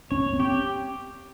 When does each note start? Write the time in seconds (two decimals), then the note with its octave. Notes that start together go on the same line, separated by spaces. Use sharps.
0.11 C#4 C#5
0.33 C4
0.40 G4